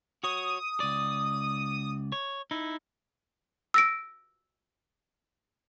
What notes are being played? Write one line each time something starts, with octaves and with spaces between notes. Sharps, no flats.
F#4 C#5 D#6
C#2 D5
C#5
D#4 E4
E6 A#6 D7